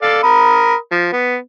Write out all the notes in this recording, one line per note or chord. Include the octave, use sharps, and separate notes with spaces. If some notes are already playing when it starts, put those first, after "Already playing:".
A4 D5 F5
A#4 B5 D#6
F3
B3